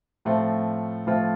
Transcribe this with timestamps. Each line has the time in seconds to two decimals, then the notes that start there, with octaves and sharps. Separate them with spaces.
0.25 A2 F3 A3 C4 F4
1.06 A2 F3 A3 C4 F4